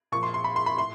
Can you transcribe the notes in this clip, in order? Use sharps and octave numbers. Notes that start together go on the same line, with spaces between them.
A#2 F3 C#6
C6
C6
B5
C6
B5
A2 C6